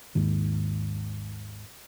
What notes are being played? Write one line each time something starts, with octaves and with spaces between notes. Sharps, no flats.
G#1 D#2 G#2 D#3